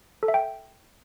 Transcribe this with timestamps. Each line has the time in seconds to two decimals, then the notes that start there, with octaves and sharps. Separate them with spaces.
0.23 A4
0.28 E5
0.34 G5